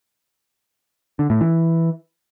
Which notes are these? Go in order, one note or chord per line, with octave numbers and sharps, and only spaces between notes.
D3
A2
E3